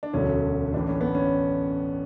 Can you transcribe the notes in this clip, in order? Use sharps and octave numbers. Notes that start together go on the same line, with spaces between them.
D4
E1 D2 D3 F#3 C#4
A1 A2 E3 D4
C#4
B3
C#4